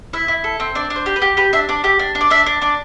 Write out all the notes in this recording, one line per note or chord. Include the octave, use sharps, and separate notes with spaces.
E4 E5
E4
A4
C4
D4 D5
D4
C5
G4
B4
G4
G4 B4
D4 E5
D4 D5
G4 E5
D4
D4
D5
D4 E5
D4
D4 D5